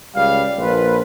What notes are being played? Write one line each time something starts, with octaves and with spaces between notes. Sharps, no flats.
C#2 G3 F5
A#1 F4 B4